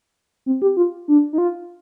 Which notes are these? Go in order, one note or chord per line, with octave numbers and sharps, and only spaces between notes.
C4
G4
F4
D4
D#4
F4